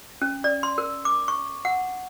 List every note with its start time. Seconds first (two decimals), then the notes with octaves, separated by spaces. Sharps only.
0.22 C#4
0.44 D5
0.63 C6
0.78 A#4
1.05 D6
1.28 C#6
1.65 F#5